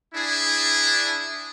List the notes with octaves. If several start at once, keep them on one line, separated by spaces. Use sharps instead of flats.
D4 E4 G#4